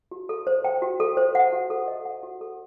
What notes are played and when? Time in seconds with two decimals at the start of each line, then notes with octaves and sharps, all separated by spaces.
0.11 F#4
0.29 A4
0.47 C5
0.64 G5
0.82 F#4
1.00 A4
1.17 C5
1.35 F#5
1.52 F#4
1.70 A4
1.88 D#5
2.05 F#5
2.23 F#4
2.41 A4